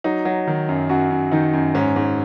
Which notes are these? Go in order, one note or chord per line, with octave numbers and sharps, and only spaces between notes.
F#3 D#4
F#3
D#3
F#2
F#2 F#4
F#2
D#3 D#4
F#2
G#2 C#4
G#2